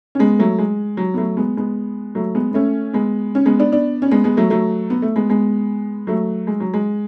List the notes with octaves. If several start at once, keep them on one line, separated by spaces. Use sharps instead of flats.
C#4
G#3 B3
F#3 A3
G#3
F#3
B3
F#3 A3
G#3 B3
G#3 B3
F#3 A3
G#3 B3
B3
A3 C#4
G#3 B3
C#4
G#3 B3
B3 D4
B3 D4
C#4
G#3 B3
G#3 B3
F#3 A3
F#3 A3
B3
A3
G#3 B3
G#3 B3
F#3 A3
G#3
F#3
G#3